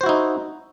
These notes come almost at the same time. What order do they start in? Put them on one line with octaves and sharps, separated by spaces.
C5 F#4 E4 D#4